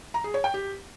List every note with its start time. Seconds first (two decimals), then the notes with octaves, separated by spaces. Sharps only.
0.14 A#5
0.24 G#4
0.34 C#5
0.44 G5
0.54 G4